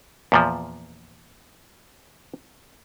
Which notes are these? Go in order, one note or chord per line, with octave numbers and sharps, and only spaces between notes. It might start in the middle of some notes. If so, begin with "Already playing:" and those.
E2 A#2 F3